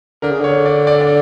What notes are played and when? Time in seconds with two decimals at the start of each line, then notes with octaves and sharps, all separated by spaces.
0.22 D3 A#4
0.31 C#3
0.40 D3 C#5
0.66 D5
0.87 D5
1.01 D5